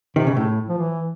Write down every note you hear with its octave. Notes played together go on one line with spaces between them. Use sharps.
C3 D#3
C#3
A2
F3
E3